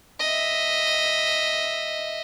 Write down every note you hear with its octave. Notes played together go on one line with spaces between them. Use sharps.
D#5 E5